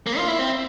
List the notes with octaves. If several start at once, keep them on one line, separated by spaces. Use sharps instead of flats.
A#3
F4
E4
C4